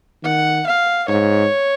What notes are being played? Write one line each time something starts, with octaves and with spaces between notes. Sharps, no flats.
D#3 F#5
F5
G#2 C#5